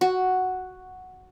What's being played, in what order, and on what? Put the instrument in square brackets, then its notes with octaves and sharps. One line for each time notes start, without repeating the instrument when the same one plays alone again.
[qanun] F#4